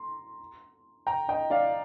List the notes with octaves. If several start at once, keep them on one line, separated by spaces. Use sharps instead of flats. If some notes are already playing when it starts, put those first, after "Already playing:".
Already playing: A#5 C6
G5 A#5
D#5 G5
D5 F5